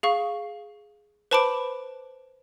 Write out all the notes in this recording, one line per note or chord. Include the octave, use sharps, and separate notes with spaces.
G#4 F5 C#6
B4 C5 A5 B5 D6 D7